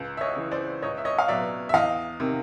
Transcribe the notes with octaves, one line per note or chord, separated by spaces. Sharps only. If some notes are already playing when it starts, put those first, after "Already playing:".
Already playing: C#2
E5
C#5 D#5
C#3 E3
C5 D5
C#2 C#5 D#5
E5
C#5 D#5
F5
B2 F#3 D5 E5
E5
E2 D#5 F5
C3 D#3